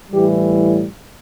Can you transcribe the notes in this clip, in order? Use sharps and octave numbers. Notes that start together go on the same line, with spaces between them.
A2 E3 G3 G4